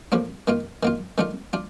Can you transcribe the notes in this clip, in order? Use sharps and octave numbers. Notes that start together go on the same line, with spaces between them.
A2 F3 A#3 D4
D#3 A#3 F4
D#3 A#3 F4
D#3 A3 D4 F4
D4 F4